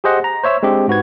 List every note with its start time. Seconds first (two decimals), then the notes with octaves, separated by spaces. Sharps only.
0.04 G4 G#4 C5 D#5 F#5
0.24 A#5
0.44 C5 C#5 E5 E6
0.63 G#3 C4 D4 G4
0.88 G#2 F#4 B4 G#6